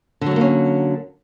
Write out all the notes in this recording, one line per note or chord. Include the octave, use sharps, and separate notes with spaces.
D3 F#3 A3 A#3 C#4